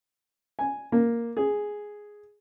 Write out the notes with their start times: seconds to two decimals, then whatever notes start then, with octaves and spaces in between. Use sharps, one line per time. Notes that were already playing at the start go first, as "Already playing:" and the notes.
0.59 G#5
0.92 A#3
1.37 G#4